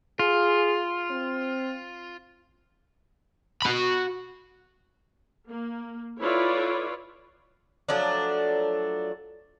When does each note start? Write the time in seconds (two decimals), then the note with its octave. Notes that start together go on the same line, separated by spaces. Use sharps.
0.19 F4 G#4
1.11 C4
3.62 F#4 B5
5.47 A#3
6.22 E4 F4 A4 B4 C#5 D5
7.89 F3 F#3 A3 D4